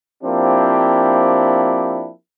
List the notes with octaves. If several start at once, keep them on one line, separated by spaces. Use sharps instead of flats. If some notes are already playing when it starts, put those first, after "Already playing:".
F3 A#3 C4 D4 E4 G4